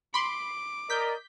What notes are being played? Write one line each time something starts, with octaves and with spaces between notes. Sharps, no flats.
B5 C6 D6
A#4 D5 D#5 G6 B6